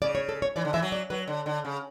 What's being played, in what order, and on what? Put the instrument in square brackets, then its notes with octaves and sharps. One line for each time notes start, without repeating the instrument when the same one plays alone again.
[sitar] C#3 [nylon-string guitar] D5
[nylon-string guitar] C#5
A4
C#5
[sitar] E3 [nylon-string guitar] D5
[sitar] D3
[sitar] E3 [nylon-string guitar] E5
[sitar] F#3
[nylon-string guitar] D5
[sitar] F#3 [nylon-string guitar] B4
[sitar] D3
D3
C#3